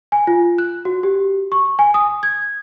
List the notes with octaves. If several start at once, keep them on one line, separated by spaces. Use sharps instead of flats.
G#5
F4
F#6
F#4
G4
C#6
G#5
D#6
G#6